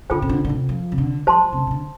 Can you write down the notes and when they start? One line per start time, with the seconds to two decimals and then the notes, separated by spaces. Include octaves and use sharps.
0.10 D3 F4 A4 C5 G5
0.22 C3
0.29 D3
0.45 D3
0.49 C3
0.69 F3
0.92 C3
0.98 D3
1.27 F3 C5 A5 C6
1.42 F3
1.52 C3
1.57 D3
1.67 C3
1.71 D3